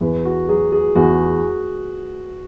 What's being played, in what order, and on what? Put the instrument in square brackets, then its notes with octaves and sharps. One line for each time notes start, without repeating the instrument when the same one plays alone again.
[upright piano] E2 [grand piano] B4
[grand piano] F#4
[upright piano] F#3 [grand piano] G#4
[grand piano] G#4
[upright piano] E2 [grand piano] F#4